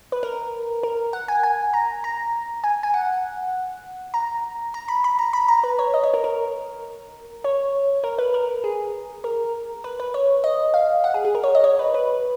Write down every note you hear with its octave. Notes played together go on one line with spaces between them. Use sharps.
B4
A#4
A#4
F#5
G#5
G#5
A#5
A#5
G#5
G#5
F#5
A#5
A#5
B5
B5
A#5
B5
A#5
B4
C#5
D#5
C#5
A#4
A#4
C#5
A#4
B4
A#4
G#4
A#4
B4
B4
C#5
D#5
F5
F#5
G#4
G#4
A#4
C#5
D#5
C#5
B4
B4